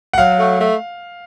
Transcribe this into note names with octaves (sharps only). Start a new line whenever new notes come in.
F#5
F#3 F5
A3
A3